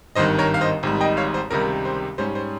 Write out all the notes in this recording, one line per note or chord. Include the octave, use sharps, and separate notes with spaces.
G#1 G2 D#3 C5 D#5
A#4 C#5
F5
C5 D#5
G#1 G#2 G3
D#5 G5
C#5 F5
C5
C#2 C3 D#3 G3 A#4
C5
G#2 G3 C#4 C5
C5